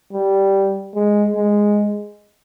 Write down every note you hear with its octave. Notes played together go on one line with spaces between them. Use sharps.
G3
G#3
G#3